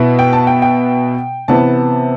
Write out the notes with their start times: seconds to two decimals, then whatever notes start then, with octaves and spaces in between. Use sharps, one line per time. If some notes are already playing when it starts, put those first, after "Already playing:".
Already playing: B2 B3 E4
0.19 G5
0.33 A5
0.47 G5
0.62 G5
1.48 C3 E3 B3 A5